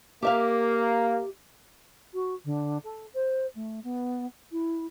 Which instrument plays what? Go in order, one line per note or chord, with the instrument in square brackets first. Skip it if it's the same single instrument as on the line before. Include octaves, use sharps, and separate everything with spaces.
[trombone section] A#3 [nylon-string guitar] G4 E5 F5
[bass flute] F#4
D3
A4
C5
A3
B3
E4